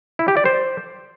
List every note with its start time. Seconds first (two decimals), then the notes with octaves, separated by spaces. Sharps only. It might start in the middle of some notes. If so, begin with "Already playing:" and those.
0.19 E4
0.28 G4
0.37 D5
0.45 C5